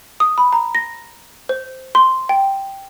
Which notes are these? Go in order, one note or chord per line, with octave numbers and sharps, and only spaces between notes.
D#6
B5
A#5
A#6
C5
C6
G5